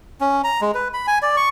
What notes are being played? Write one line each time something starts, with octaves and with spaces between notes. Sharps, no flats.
C#4
A#5
G#3
B4
B5
G#5
D5
C#6